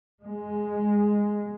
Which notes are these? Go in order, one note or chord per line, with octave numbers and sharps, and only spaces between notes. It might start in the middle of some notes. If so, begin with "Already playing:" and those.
G#3